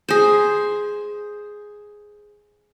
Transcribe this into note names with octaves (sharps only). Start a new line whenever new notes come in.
G#4 C5